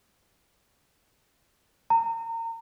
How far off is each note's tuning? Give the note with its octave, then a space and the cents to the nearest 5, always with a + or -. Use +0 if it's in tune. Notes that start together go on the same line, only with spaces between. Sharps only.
A#5 -30